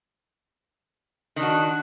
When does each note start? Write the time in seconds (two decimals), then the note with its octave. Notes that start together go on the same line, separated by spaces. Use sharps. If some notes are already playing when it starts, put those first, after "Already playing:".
1.36 D#3
1.39 D4
1.42 F#4